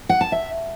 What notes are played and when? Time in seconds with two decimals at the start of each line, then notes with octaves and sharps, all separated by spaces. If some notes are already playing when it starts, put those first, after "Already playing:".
0.09 F#5
0.21 A5
0.32 E5